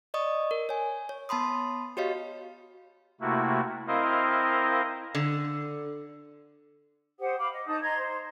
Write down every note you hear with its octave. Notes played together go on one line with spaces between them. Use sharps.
D5 D#5 C#6 D#6
A#4
C#5 G#5
C#5
B3 A5 B5 C6 D#6
F#4 G4 C#5 D#5 F5
C3 A3 A#3 E4 F#4
C4 E4 A#4 C5 D#5 F5
D3
G4 C5 F#5 D#6
F5 B5 D6
D#5
D#4 A5 D#6 G6
D#5 A#5 C6 G#6
C5